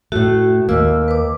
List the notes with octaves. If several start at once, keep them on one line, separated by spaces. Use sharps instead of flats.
A2 A3 F#4
D#2 A#3 E6
B4 D6